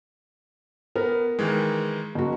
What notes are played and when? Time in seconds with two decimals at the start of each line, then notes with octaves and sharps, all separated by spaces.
0.96 B3 A#4
1.39 D#3 E3 G#3
2.15 F#1 F#4